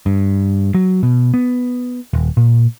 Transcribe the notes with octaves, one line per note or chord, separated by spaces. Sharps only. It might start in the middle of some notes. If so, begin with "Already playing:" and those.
G2
F#3
B2
B3
D#1
A#2